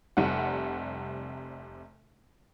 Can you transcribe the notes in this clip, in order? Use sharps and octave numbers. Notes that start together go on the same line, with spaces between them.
F1 C3 G3 F#5